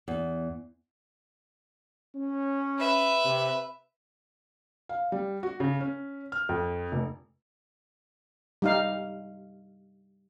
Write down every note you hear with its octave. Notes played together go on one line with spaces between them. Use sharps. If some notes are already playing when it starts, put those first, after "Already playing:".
E2
C#4
B4 E5
C3
F5
G3
F#4
C#3
C#4
F6
F2
F1
G3 D#4 F5